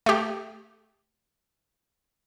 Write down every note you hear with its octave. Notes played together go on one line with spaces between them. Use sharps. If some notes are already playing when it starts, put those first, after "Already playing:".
A3 G4